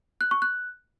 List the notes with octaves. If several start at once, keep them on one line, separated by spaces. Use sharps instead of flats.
F#6
C#6
F#6